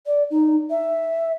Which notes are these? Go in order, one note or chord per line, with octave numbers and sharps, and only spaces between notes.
D5
D#4
E5